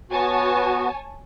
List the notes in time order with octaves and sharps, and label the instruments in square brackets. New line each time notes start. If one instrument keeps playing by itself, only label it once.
[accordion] B3 F#4 [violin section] C#5 G#5 A5